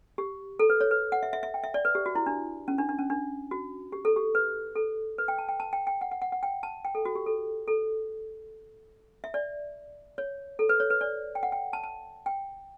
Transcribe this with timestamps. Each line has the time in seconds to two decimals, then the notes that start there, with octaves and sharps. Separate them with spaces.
0.18 G4
0.59 A4
0.70 B4
0.81 C#5
0.91 B4
1.12 F#5
1.23 E5
1.33 E5
1.43 E5
1.54 G5
1.63 E5
1.74 D5
1.85 B4
1.95 G4
2.06 F#4
2.15 E4
2.26 D4
2.68 C#4
2.78 D4
2.89 D4
2.99 C#4
3.10 D4
3.51 F#4
3.92 G4
4.05 A4
4.16 G4
4.35 B4
4.76 A4
5.18 B4
5.28 G5
5.38 A5
5.49 G5
5.60 A5
5.73 G5
5.87 G5
6.01 F#5
6.11 F#5
6.22 F#5
6.32 F#5
6.43 G5
6.63 A5
6.85 G5
6.95 A4
7.05 F#4
7.15 G4
7.26 A4
7.68 A4
9.24 E5
9.34 D5
10.18 C#5
10.59 A4
10.69 B4
10.80 C#5
10.90 B4
11.01 D5
11.35 G5
11.43 F#5
11.52 G5
11.73 A5
11.83 A5
12.26 G5